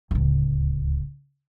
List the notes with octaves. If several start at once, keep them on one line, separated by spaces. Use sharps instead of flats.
D1 C#2